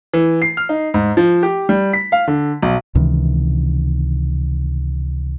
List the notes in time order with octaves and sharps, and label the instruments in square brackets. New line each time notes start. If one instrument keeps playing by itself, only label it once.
[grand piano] E3
C7
F6
D#4
G#2
F3
G4
G3
B6
F5
D3
B1
[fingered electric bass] C#2 C3 D#3 E3